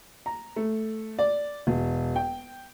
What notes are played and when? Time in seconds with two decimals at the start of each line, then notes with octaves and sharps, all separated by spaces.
0.26 A#5
0.56 A3
1.19 D5
1.67 E1
2.16 G5